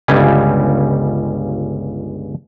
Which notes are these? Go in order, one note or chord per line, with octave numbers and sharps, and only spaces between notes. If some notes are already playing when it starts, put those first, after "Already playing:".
G1 C#2 C#3 G3 G#5